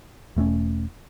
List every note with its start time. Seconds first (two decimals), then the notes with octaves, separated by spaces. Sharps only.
0.36 E1 A3 C4 C#4